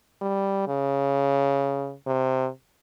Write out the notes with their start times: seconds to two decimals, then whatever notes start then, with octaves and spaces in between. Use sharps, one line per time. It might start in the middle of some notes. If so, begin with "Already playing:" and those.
0.21 G3
0.68 C#3
2.06 C3